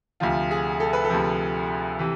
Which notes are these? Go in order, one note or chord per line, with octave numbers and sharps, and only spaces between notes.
D2 C3 F3 F4
G#4
A4
B4
A4
D2 C3 F3
C3 E3